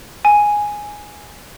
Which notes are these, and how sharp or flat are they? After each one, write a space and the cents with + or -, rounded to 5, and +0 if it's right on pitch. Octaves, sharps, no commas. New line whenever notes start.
G#5 +0